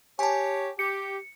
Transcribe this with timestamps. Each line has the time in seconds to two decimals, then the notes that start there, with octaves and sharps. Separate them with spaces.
0.19 G4 C#5 G#5 A5
0.79 G4 C#7